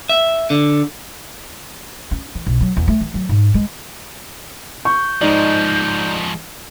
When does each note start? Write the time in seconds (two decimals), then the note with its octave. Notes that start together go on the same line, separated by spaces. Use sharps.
0.09 E5
0.50 D3
2.11 C#4
2.35 E3
2.47 B1
2.60 F#3
2.77 E2
2.88 A3
3.01 E3
3.14 F#3
3.29 G#2
3.54 G#3
4.85 C#6 G6
5.21 G#2 F3 G#3 D#4 D5